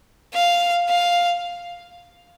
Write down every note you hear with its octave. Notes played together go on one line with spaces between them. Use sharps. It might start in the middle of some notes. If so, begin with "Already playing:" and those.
F5
F5